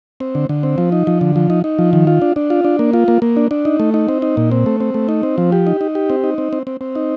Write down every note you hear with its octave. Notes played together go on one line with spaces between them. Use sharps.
C4
D3
D3
C4
F3
D#4
F3
D3
F3
D#4
D#4
F3
D#3
F4
D4
D4
F4
D4
A#3
F4
A#3
A#3
D4
D4
D#4
A3
D#4
C4
D#4
A#2
C4
A3
C4
A3
D#4
C4
F3
G4
D#4
D#4
G4
C4
D#4
C4
C4
C4
C4
D#4